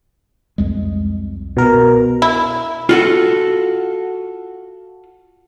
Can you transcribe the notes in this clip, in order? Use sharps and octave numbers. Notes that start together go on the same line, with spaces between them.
C2 F2 G#3
B2 A#4
E4
F4 F#4 A4